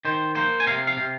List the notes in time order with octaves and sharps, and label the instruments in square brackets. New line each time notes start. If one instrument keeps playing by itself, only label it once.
[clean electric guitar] D#3 C5
A#3 C5
G#5
C3 F5
F5
C3